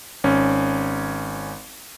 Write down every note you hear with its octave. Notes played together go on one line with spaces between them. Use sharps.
G#1 C#4